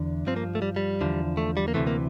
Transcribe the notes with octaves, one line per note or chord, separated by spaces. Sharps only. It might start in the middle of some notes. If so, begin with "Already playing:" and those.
Already playing: E2 D3
G2 F3 C4
A#3
A3
G3
G3
E2 D3 F3
A3
G3
A#3
D2 C3 E3 A3
A#3